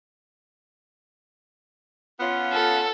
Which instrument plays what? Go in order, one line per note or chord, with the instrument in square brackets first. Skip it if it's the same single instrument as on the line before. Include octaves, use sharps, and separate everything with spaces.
[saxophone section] B3 C#4 F4
[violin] A4